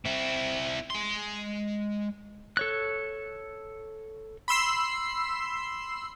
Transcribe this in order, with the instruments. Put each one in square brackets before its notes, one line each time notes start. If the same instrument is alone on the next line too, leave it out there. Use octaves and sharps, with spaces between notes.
[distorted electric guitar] C4 E4
G#3 C6
[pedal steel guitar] A4 C#5 F#6
[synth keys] B5 C6 E6 C7